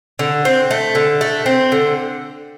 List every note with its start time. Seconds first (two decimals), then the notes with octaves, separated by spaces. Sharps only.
0.19 D3
0.45 C4
0.71 A3
0.95 D3
1.21 A3
1.46 C4
1.72 D3